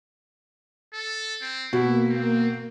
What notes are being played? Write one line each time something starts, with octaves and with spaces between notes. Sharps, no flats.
A4
C4
B2 A#3 E4 F#4
C4